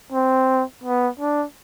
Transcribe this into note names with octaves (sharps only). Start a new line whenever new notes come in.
C4
B3
D4